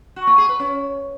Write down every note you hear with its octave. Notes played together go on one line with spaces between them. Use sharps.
F#4
A#3
G#4
B4
C#4